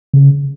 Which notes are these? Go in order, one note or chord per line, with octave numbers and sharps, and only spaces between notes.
C#3